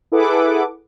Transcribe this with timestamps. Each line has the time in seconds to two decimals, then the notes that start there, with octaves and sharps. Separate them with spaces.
0.12 E4 G#4 A4 B4 F#5 D6